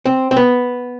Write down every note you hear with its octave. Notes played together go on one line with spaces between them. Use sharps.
C4
C4
B3